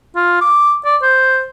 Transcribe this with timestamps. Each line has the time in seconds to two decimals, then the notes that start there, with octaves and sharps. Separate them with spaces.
0.16 F4
0.41 D6
0.85 D5
1.03 C5